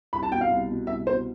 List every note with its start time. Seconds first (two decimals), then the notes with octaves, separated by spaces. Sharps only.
0.13 C2 B5
0.23 A5
0.31 B2 G5
0.41 F5
0.50 C2
0.69 B2
0.87 C2 E5
1.06 B2 C5